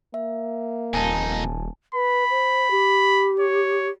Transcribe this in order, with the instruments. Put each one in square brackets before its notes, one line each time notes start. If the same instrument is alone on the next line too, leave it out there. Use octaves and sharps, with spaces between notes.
[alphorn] A#3 [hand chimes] E5
[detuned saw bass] D#1 [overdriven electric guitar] F2 D#4 [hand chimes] G#5 A5
[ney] B4 [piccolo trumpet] B5
[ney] C5
G4
[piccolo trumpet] C#5